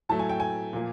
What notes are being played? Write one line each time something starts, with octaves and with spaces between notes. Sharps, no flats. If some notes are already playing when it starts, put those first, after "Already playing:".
A2 F#3 A3 A5
G#5
G5
G#5
A#2 F3 A#3